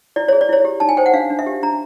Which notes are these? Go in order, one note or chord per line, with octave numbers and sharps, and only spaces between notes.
E4 D5
G#4 C#5
D5
E4 C#5
G4
D#4 A5
G#5
C5 G5
F#5
D4 F5
D4
E5
G4
D4 A#5